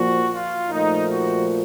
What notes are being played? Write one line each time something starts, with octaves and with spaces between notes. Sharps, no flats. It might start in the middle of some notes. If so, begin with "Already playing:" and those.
Already playing: A#2 F3 A#3 F#4
F4
A#2 F3 A3 D#4
F#4